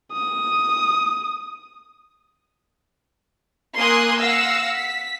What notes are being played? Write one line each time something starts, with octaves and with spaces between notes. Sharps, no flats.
D#6
A#3 G#5 C6 D#6 F#6
F5 F#5 E6 A#6
B6